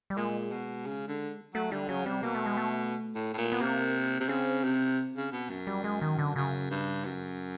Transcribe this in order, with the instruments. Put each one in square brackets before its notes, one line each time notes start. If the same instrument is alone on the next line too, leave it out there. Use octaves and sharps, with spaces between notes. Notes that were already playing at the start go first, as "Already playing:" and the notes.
[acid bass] G3
[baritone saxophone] A#2 [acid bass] G#3
[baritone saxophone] B2
C#3
D3
[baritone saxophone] F#3 [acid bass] A3
[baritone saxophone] D3 [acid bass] G3
[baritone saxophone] C#3 [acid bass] F#3
[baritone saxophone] C3 [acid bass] G3
[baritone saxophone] B2 [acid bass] A#3
[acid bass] A3
G#3
A3
[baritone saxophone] A2
A2
A#2
[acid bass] B3
[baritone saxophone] C3 [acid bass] A#3
[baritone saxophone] C3
[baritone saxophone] C#3 [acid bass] C4
[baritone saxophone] C3
C#3
B2
F#2
[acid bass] G3
G#3
D#3
D3
[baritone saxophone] F#2 [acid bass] C#3
[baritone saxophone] G2
F#2